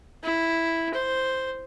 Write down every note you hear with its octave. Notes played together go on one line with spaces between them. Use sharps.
E4
C5